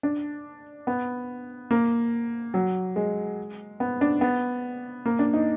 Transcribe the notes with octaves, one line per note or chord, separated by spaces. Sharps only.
D4
B3
A#3
F#3
G#3
B3
D4
B3
A#3
D4
D#4